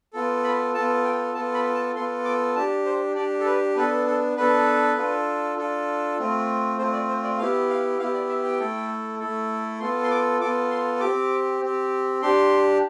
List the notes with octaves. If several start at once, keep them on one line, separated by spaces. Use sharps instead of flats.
B3 F4 A4
B5
B3 F4 A4 A5
G5
B3 F4 A4 A5
B5
A5
B3 F4 A4 C6
D6
D4 G4 A5
C5
D4 G4 D5
A4
B4
B3 D4 A4 B4
A4
B3 D4 A4 B4
D4 F4 A4
D4 F4 A4
A3 C4 F4
A3 C4 F4 C5
D5
C5
D5
B3 E4 G4 F5
F5
B3 E4 G4 F5
D5
E5
G5
A3 E4 A4
A3 E4 A4
B3 F4 A4 C6
C6
D6
B3 F4 A4 D6
C6
G4 D6
C4
C4 G4
D4 G4 C6